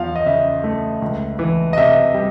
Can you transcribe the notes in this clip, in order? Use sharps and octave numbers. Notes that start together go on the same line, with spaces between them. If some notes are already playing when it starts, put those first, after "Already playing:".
Already playing: E2 F3 F5
D#5
C#3 E5
A3
C#2
E3
D#5
C3 E5
G3